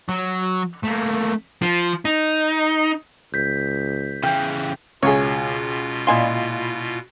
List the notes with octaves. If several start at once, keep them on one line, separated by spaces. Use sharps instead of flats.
F#3
A3 A#3
F3
D#4
C#2 G6 B6
C#3 E3 G5
C#2 B2 F4 G#4 C#5
A#2 E4 D#5 F5 G#5 C6